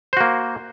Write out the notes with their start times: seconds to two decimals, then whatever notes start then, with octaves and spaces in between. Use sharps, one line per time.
0.13 C5
0.17 F#4
0.21 A#3